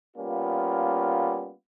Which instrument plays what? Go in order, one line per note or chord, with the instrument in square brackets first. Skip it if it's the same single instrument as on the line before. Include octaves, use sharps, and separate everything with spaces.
[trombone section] G3 A#3 B3 C#4 F4